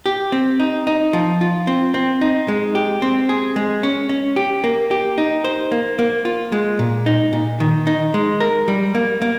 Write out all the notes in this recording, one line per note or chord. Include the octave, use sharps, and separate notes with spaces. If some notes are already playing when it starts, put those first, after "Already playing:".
G4
C4
D#4
D#4
F3
F4
C4
C4
D#4
G#3
G4
C4
G#4
G#3
C#4
C#4
G4
A#3
G4
D#4
C5
A#3
A#3
F4
G#3
A#2
D#4
A#2
D#3
D#4
G#3
A#4
G3
A#3
A#3